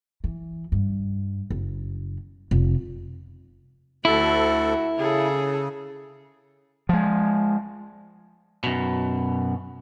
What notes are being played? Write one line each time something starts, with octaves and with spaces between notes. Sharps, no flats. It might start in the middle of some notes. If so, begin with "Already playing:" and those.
E3
G2
F#1
F1
D2 E4 F#4 A4
C#3 G#4 A4
F3 G#3
F#2 B2